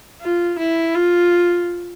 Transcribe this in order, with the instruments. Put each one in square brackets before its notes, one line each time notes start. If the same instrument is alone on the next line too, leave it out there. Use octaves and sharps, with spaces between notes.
[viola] F4
E4
F4